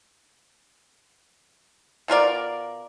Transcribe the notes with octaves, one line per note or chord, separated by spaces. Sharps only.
B2 F4 A#4 D5